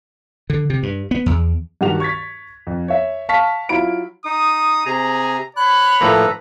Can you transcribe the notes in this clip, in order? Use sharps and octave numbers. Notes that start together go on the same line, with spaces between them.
D3
C3
G2
B3
E2
G2 D#3 F#4 G4 F7
C#6 G#6 A6 B6
F2
C#5 E5
F5 A5 C#6 F6 B6
F#3 E4 F4 B5 D7
D#4 D#6
C3 G#4 A#5
C#5 B5 F#6
A2 F3 A#3 A4 B4 A#5